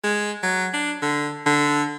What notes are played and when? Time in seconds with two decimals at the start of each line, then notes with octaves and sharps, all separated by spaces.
0.04 G#3
0.43 F#3
0.73 D4
1.02 D3
1.46 D3